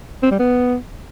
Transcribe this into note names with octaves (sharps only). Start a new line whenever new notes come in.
C4
G3
B3